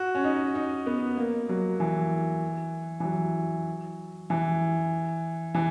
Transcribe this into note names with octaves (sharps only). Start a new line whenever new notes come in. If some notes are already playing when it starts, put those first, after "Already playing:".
Already playing: F#4
C#4
D#4
D#4
B3
A#3
F#3
E3
E3
F#3
E3
E3